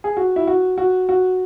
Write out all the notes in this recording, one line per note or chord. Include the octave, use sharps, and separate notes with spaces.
G#4
F#4
E4
F#4
F#4
F#4